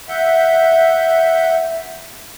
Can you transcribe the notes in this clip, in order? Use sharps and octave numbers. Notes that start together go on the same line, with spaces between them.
E5 F#5 G6